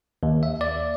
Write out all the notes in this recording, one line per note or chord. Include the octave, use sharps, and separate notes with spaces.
D#2
E5
D5